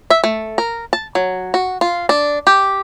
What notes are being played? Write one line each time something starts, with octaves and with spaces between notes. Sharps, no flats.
E5
A3
A#4
A5
F#3
F#4
F4
D4
G4